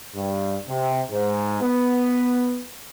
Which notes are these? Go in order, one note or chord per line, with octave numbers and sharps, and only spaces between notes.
G2
C3
G#2
B3